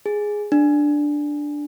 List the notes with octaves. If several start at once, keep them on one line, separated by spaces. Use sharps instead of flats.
G#4
D4